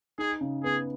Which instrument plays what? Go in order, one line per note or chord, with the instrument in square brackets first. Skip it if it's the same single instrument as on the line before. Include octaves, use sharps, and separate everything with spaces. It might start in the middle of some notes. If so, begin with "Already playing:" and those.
[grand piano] D#4 [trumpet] G#4
[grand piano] C#3
[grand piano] B3 [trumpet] G#4